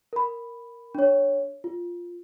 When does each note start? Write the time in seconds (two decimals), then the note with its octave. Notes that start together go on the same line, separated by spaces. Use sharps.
0.13 A#4 B5
0.95 D4 C#5
1.64 F4